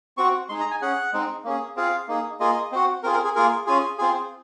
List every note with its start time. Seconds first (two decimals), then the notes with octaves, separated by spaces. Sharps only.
0.17 C4 F#4 C#6
0.49 G#3 D#4 G#4 C6
0.60 A#5
0.71 G#5
0.82 C#4 G#4 F#5
1.13 G#3 C4 D#4
1.44 A#3 C#4 G#4
1.76 C4 F4 G#4 F5
2.08 A#3 D#4 G#4
2.40 A#3 F4 G#4 D#5
2.72 C4 F#4
3.03 C4 F4 G#4 A#4
3.14 A#4
3.24 G#4
3.36 A#3 F4 G#4 A#4
3.67 C#4 F4 G#4
3.98 C4 F4 G#4